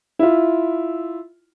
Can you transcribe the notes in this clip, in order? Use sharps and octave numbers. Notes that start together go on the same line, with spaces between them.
E4 F4